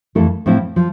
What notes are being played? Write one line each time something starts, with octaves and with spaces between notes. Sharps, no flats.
F2 E3 A3 E4 A4
A2 F3 A3 C4 E4
F3